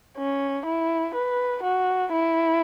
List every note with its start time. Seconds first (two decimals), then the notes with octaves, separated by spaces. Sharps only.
0.18 C#4
0.66 E4
1.15 B4
1.63 F#4
2.12 E4